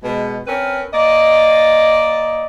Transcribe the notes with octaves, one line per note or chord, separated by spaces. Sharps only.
B2 G#3
C4 C#4 A#4 B4
A#3 D5 D#5